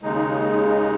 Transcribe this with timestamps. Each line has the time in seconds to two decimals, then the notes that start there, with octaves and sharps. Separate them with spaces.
0.02 D#2 C#3 G#3 D#4